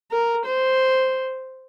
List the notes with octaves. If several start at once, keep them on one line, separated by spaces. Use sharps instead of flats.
A#4
C5